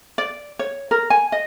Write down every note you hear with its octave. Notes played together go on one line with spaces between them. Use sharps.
D5
C#5
A#4
G#5
D#5